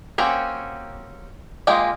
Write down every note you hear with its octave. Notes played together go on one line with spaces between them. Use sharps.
A#3 C4 C#4 F#4 G4
G#3 A#3 F4 G4 G#4